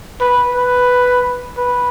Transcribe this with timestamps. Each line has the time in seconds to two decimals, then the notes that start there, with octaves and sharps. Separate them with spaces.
0.21 B4
0.55 B4
1.58 B4